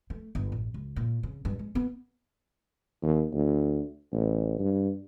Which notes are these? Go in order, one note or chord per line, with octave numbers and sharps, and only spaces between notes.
A3
G1
A1
C#2
A#2
C#3
G2
G#3
B3
D#2
D2
A1
G2